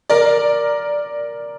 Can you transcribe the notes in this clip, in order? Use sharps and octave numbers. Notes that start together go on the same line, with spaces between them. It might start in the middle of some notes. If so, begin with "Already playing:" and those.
A#4 D5